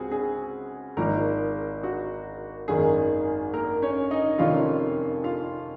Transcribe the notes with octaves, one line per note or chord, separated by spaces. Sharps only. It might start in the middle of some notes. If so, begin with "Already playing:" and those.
Already playing: C#2 C#3 C4 F#4 G#4
G#4
G#1 G#2 F3 A#3 A#4
F#4
G#1 F#2 D#3 A#3 G#4
A#3 A#4
C#4 C#5
D#4 D#5
F1 F2 D#3 A#3 C#4 F4 F5
F4 F5